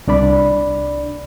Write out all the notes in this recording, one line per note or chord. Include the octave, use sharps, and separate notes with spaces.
C2 D4 D5 B5